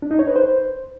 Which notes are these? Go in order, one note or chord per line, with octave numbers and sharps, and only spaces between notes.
D4
D#4
C#5
B4
C5